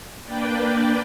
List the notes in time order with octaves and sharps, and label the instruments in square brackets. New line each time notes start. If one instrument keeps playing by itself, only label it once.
[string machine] A#3 D4 B4 D5 G5